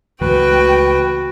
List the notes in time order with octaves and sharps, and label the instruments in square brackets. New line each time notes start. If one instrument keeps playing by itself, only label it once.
[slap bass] C#2 E3 A3 [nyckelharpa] F#4 [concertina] B4 [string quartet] G5